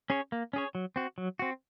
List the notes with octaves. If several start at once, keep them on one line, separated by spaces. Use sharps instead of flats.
C#4 G#4 C#5
A#3
C#4 G#4 C#5
F#3
C4 F#4
F#3
C4 F#4